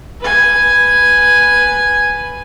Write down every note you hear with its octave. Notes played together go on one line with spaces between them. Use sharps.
B4 G#5